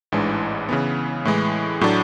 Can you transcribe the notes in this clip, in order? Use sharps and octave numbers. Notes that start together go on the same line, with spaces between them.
A1 G#2 E3 G#3 D4
C#3 E3 B3
A2 E3 G#3
A2 F#3 A3 D4